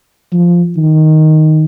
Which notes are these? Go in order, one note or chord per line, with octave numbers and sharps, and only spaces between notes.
F3
D#3